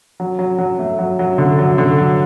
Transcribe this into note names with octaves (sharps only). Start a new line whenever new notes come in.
F#3
F#3
F#3
A3
F#3
F#3
D3
F#3
D3
F#3